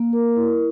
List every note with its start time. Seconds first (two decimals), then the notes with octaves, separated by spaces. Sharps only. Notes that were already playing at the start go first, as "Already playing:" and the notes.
Already playing: A#3
0.13 A#4
0.36 E4